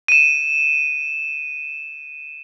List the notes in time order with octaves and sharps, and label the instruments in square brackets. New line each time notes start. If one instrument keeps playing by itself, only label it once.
[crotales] D#7 E7